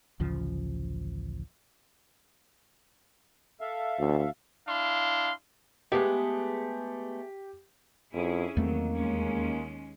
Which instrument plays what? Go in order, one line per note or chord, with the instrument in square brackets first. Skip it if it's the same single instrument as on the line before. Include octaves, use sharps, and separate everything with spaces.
[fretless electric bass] A1 D2 C#3 F3
[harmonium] A4 E5 F5
[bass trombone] D2
[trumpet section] D4 E4 F5 C6
[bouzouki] G#3 A3 B3 [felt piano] G4
[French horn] F2 [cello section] C#4 E4 G#4
[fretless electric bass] E2 A3 C4 [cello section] D#3 F#3 [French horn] A#3
[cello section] D#2 G#3 C#4